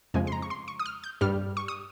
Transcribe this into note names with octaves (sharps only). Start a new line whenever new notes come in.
F2 C#3 F3 G#3 G#5
C6
A#5
C#6
C6
C#6
D#6
F6
G6
G2 G3 F6
C#6
D#6